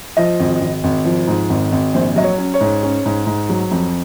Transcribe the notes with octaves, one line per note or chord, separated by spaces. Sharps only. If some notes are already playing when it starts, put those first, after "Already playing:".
F3 D#5
G#1
G#1
G#1
F3
G#2
G#1
G#1
A#1 C5
F#3 D#5
C#5
C#4
C#5
G#2
C#4
G#2
G#2
F#3
F2